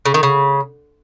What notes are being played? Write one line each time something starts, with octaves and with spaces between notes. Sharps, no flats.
C#3
D#3
C#3